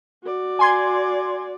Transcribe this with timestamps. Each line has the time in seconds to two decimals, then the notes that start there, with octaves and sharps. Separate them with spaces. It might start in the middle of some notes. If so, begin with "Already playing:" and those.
0.23 F#4 D5
0.59 G#5 C6 G#6